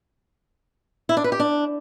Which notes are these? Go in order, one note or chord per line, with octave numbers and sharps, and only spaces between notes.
E4
D4
B4
G4
D4